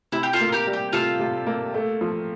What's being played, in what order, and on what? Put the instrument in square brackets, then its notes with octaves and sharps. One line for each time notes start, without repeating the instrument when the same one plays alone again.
[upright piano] C3 [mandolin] E4
[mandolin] G4
F4 A4
[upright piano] A#3
[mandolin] G4 A#4
[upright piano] G3
[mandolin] G4
[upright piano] C3 [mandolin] F4 A4
[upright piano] C3
A#3
A3
F3